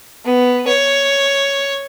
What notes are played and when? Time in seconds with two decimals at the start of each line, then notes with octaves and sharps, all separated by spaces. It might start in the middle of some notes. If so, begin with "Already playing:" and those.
0.25 B3
0.68 C#5